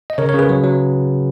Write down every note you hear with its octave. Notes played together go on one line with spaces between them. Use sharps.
D#5
C#3 A#4 C#5
A#4 C#5
C#3 G#4 B4
F#3
F#3